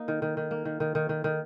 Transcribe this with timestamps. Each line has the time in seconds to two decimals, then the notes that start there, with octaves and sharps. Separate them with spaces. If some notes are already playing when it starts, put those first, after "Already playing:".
Already playing: A#3 D#4
0.08 D#3
0.22 D#3
0.37 D#3
0.51 A#3
0.65 D#3
0.80 D#3
0.95 D#3
1.09 D#3
1.24 D#3